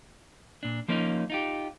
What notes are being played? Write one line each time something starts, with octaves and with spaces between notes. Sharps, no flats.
A#2 D4
F3 A#3 C#4 D#4
D#4 F4 G4